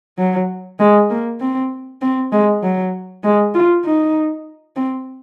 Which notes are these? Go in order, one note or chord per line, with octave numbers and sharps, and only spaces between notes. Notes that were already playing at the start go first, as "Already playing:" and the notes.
F#3
G#3
A#3
C4
C4
G#3
F#3
G#3
F4
D#4
C4